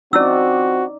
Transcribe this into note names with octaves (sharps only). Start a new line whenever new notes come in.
F3 C4 C#4 D#4 E4 F#4 D5 E6